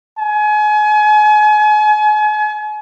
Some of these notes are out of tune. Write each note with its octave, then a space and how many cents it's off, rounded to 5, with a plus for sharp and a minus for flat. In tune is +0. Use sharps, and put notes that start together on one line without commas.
G#5 +35